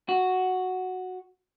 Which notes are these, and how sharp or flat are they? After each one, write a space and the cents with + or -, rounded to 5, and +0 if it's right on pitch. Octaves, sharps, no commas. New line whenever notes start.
F#4 +0